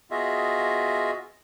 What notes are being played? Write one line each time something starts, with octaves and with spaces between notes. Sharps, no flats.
B3 F4 F#4 G#4 D#5 E5